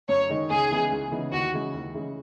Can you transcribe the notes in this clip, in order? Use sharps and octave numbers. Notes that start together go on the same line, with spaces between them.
F#2 C#5
D#3 G#3 D#4
C#2 G#4
C#3 E3 B3 D#4
C#2
C#3 E3 B3 D#4
D#2 F#4
C#3 E3 G#3
D#2
C#3 E3 G#3